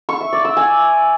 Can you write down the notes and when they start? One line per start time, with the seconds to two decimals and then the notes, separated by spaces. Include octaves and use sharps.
0.09 C#6
0.21 E5
0.33 D5
0.45 E6
0.57 G#5